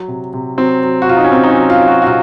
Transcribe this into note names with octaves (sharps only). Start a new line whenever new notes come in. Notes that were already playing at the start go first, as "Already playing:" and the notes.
Already playing: F#3
C3
C3
F#3 C4
F#3
F#4
C3 F4
D#4
C#4
C3 C4
D#4
C#4
F#3
F4
F#3
F#4
F#4
C3 F4